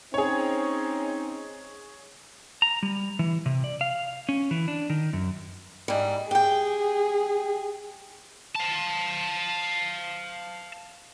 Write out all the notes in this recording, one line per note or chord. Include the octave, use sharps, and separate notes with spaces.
C4 C#4 D#4 G#4 C#5
A#5
G3
E3
C3
D5
F5
C#4
E3
D4
D#3
F#2
G#2 G3
G4 G#4 G5
F5 A5